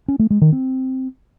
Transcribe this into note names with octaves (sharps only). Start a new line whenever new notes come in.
C#4
A3
G#3
D#3
C4